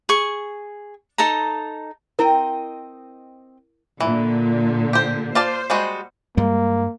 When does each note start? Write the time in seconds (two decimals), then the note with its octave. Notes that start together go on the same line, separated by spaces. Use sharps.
0.09 G#4 C#6
1.18 D#4 A4 A5 A#5
2.19 C4 E4 A#4 D#5 G5
4.00 A#2 D3 E3
4.93 G4 C5
5.35 F4 C5 D5 A5
5.70 G3 G#3 F#4
6.37 G2 G3 G#3 A#3